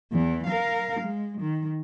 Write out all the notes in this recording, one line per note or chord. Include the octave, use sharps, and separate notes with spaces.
E2 E3
A#4 F5
G#3
D#3